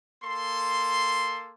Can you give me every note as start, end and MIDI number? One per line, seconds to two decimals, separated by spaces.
0.23 1.54 58
0.23 1.54 69
0.23 1.54 84